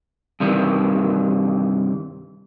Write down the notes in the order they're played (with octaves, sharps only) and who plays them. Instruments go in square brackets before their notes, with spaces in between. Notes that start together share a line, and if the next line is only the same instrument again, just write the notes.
[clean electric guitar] G2 C3 D#3 E3